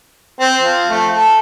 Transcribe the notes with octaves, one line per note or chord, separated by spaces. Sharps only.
C4 C5
F3
A3
A4